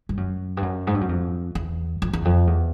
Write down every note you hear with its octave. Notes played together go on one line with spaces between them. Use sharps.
G2
F#2
G2
F#2
G#2
G2
F#2
F2
E2
F2
E2
F2
E2